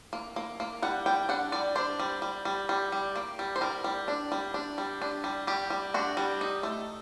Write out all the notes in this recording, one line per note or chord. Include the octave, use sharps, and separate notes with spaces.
A#3
A#3
A#3
G3 F#5
G3 G5
D4 F#5
G3 D5
D4 C5
G3
G3
G3
G3
G3
A#3
G3
C5
G3 A#4
G3
D4
G3
D4
G3
D4
G3
G3 G4
G3
D4 F#4
G3
D#4
A3